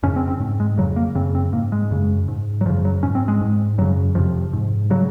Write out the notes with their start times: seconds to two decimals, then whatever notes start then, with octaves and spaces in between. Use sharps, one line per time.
0.03 F2 C#3 C#4
0.16 C4
0.28 C4
0.40 G#2
0.60 G#3
0.78 F2 C#3 F#3
0.96 A#3
1.15 F#2 C#3 C4
1.35 C4
1.53 G#2 A#3
1.72 G#3
1.91 F#2 C#3
2.28 G#2
2.61 F#3
2.65 F#2 F3
2.69 C#3
2.85 F#3
3.03 G#2 C#4
3.15 C4
3.28 G#3
3.41 G#2
3.78 F#2 C#3 F#3
4.15 F2 C3 F3
4.53 G#2
4.90 C#3 F#3